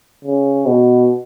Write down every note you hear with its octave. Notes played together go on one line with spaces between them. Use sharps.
C#3
B2